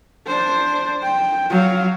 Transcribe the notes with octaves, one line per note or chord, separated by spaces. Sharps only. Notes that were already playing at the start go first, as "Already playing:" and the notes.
D4 C5
G5
F#3 F5